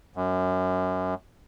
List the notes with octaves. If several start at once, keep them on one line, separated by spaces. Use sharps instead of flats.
F#2